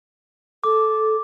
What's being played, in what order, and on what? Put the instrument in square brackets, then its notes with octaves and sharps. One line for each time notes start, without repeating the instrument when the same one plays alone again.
[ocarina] A4 [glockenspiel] D6